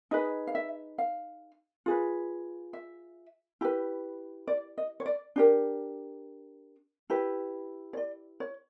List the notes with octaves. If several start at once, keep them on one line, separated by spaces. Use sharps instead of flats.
D#4 G#4 B4 D#5
F5
E5
F5
F4 G#4 B4
E5
E4 G4 B4
D5
D#5
C#5
D5
D4 G4 A#4
E4 G4 B4
C#5
D5
C#5